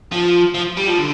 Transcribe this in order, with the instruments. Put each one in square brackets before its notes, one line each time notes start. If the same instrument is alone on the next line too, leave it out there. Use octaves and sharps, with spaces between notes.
[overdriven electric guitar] F3
F3
G3
F3
D3